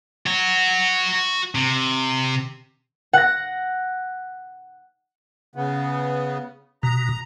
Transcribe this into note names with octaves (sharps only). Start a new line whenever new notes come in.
F#4 C#5
C3
F#5 A#6
C#3 B3
B2 A#5